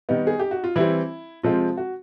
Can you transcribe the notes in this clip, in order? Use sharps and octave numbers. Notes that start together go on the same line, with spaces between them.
D#3 G3 B3 D#4
G#4
G4
F#4
F4
E3 G3 C4 E4
C3 F3 G#3 C4 F4
F#4